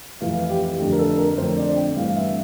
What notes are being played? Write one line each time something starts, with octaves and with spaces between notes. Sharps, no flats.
F2 E3 A3 F5
G4
F2 D3 A3 G4
A#4
A4
A#4
F2 D3 A3 C4 C5
D5
G5
G2 E3 A3 C4 F5
E5